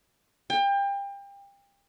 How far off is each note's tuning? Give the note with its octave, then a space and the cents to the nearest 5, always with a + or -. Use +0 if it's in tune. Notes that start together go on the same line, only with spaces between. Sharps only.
G5 +30